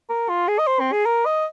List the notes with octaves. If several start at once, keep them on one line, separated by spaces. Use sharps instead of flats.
A#4
F4
G#4
D#5
C5
C4
G#4
A#4
D#5